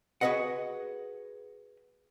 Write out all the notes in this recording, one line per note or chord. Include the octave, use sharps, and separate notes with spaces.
F#4 G#4 A4 B4 D#5 F#5